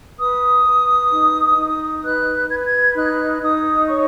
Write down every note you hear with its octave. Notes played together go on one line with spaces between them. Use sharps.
B4 D#6
B4
D#4
D#4
B4 F#6
B4 G#6
G#6
D#4 F#6
D#4 D#6
C#5 C#6